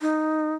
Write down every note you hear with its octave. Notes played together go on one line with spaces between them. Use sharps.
D#4